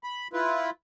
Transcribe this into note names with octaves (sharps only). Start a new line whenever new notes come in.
B5
E4 F4 B4